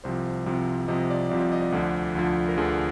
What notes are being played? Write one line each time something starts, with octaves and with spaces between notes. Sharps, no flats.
C2 C3 F3 C5
C2 C3 F3
C2 C3 F3 D#5
D5
C2 C3 F3 D5
D5
D#5
D5
D2 D3 F3
D2 D3 F3
A#4
D2 D3 F3 G#4